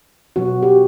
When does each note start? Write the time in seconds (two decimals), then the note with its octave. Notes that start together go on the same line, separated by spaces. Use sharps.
0.36 B2 F#3 B3 F#4
0.63 G4